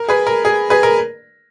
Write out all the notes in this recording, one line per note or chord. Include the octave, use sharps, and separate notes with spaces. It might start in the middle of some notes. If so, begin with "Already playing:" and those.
Already playing: A#4
G#4 B4
A#4
G#4
G#4 B4
A#4